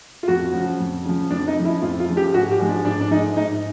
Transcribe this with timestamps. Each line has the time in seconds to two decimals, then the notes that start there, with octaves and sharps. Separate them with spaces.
0.23 F4
0.28 F2 F#4
0.54 C#3 F3
0.80 F2
1.05 C#3 F3
1.30 F2 D4
1.48 D#4
1.57 C#3 F3
1.65 E4
1.82 F2 F4
2.00 F4
2.08 C#3 F3
2.17 G4
2.34 G#2 F#4
2.51 G4
2.59 F3 G#3
2.69 D4
2.85 G#2 D4
3.01 D4
3.11 F3 G#3 D#4
3.37 G#2 D#4